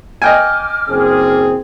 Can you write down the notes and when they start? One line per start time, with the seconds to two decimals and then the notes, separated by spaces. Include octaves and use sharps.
0.22 D#5 G5 G#5 D6 F6
0.89 F#1 C4 G#4